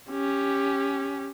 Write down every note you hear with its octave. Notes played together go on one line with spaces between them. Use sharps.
C#4 G4